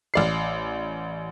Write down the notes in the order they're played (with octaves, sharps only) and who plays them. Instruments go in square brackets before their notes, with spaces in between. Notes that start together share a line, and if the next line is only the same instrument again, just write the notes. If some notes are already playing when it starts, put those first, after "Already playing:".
[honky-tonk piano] A1 D5 C7